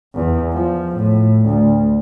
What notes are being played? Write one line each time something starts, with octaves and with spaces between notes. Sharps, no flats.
E2
F3
A2
D2